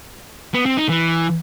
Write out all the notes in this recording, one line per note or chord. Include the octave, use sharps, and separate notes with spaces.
B3
C4
D#4
E3